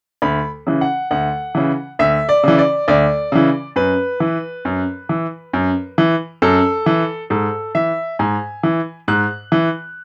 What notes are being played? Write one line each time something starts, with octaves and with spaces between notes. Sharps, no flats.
D2 B5
C#3 E3
F#5
D2 F#5
C#3 E3
D2 E5
D5
C#3 E3
D5
D2 D5
C#3 E3
F#2 B4
E3
F#2
E3
F#2
E3
F#2 A4
E3
G#2 A4
E3 E5
G#2 G#5
E3
G#2 F#6
E3